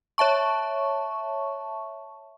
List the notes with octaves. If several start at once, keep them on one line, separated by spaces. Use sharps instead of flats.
C#5 E5 A5 C#6